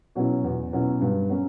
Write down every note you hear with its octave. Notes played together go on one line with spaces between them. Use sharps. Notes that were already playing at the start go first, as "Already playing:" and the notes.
B2 F#3 C#4 E4
E2
B2 F#3 C#4 E4
G2
F#3 C#4